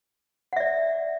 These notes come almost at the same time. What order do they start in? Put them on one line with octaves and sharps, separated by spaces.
F#5 E5 D5